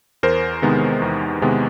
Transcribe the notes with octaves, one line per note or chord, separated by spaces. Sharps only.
E2 A#4 C5
C3 D#3 G#3 B3
E2
C3 D#3 G#3 B3